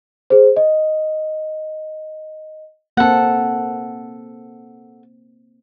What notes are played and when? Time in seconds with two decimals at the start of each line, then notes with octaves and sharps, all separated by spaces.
0.30 G#4 C5
0.56 D#5
2.97 A#3 C4 A4 F#5